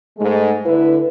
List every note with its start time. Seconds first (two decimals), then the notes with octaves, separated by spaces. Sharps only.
0.19 G#2 G#3 A3
0.66 D3 E4 B4